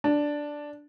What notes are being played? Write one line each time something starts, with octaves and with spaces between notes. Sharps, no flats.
D4